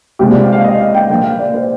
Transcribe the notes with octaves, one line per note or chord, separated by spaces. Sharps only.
C2 C3 F3 G#3 G4
D5
F5
F5
D#5
F5
G5
A#1 A#2 F3 A#3 G5
F5
D5
C5